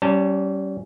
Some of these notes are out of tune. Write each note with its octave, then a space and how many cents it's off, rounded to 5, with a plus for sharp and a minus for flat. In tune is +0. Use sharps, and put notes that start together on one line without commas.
G3 -30 C#4 +0 A5 +30